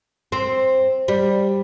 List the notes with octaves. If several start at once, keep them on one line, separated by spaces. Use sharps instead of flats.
C4
G3